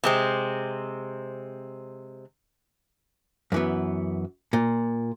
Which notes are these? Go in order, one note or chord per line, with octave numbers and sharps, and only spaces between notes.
C3 G#3 C4
F#2 E3 B3
A#2